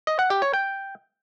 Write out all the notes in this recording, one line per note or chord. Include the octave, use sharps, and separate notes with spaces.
D#5
F#5
G4
C#5
G5